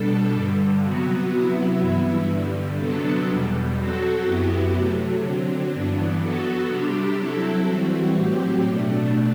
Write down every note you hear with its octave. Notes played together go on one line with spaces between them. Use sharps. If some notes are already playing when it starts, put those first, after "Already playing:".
Already playing: B2 G3 D4 A4
G2 D3 G3
C3 F#3 B3 F#4
C3 F#3 B3 E4
G2 E3 B3 E4
G2 D3 G3
C3 F#3 B3 D4 A4
E2 B2 G3
F#3 C4 F#4 A4
F#2 F#3 B3 E4 G4
C3 F#3 A3
D3 F#3 C4
G2 E3 B3 D4
F#3 B3 F#4 A4
C3 G3 D4 G4
F#3 C4 E4 A4
E3 G3 C4 F#4
A2 F#3 C4 G4
B2 A3 D4